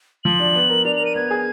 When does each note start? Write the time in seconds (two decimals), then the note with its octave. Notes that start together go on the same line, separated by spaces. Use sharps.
0.24 F3 F#7
0.39 D4
0.55 B3
0.70 A#4
0.85 D4 F7
0.96 A#4 F7
1.05 D#7
1.15 B3 G#6
1.31 G#4